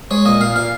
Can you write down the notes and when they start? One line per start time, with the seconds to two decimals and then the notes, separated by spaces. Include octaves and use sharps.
0.11 G#3 C#5
0.25 A#2 D#5
0.41 A#2 F5
0.56 A#2 F5